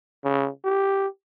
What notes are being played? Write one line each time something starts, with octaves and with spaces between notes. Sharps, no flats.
C#3
G4